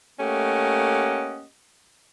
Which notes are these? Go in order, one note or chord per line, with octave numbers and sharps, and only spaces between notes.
A3 A#3 C#4 G4 D#5 F#5